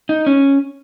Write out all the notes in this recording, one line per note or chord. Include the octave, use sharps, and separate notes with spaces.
D#4
C#4